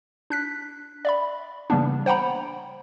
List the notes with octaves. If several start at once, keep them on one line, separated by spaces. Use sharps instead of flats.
D4 F#6 B6
D5 E5 B5
C#3 E3 G3 A#3 B3 D4
C5 F#5 G5 A#5 B5